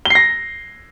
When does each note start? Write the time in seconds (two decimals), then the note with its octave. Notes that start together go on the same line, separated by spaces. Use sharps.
0.05 G7
0.10 C7
0.15 A#6